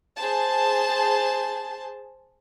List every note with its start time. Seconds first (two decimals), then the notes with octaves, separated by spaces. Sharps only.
0.17 G#4 C5 A5